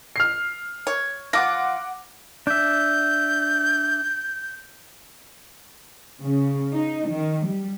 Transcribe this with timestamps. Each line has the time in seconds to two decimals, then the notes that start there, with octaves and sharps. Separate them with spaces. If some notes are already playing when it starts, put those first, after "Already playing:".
0.16 F6 C7
0.87 C#5
1.33 F3 F4 F#5 D6 A#6
2.47 D4 E5 G6
6.22 C#3
6.73 D#4
7.09 D#3
7.46 G3